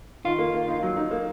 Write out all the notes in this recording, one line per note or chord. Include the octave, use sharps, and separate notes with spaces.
D#3 F4
A#3
A#3
D#4
F#3
D#4
A#3